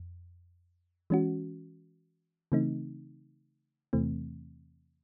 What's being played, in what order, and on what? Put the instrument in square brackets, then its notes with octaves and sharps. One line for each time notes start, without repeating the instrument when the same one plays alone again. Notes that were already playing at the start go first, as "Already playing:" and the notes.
Already playing: [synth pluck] F2
E3 G#3 C#4 F#4
C#3 E3 A3 C4 D#4
E2 C3 E3 A3 C4